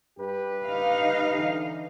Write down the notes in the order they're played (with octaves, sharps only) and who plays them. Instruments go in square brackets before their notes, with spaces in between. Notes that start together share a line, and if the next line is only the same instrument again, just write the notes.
[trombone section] G2 G4 B4
[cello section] D#4 F5
[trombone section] D3 E3